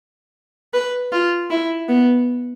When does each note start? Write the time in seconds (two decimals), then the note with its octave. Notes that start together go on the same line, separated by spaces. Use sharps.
0.74 B4
1.12 F4
1.50 E4
1.89 B3